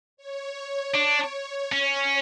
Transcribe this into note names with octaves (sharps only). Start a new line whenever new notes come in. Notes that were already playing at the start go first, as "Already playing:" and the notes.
C#5
D4
C#4 C#5